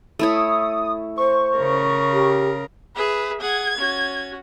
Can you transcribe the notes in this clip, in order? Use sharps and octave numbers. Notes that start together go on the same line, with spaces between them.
A3 E4 C#5 D#6
C5 C#6
C#3 A#4
G4
G#4 B4 E5
G#4 F#5 G#6
C#4 F#4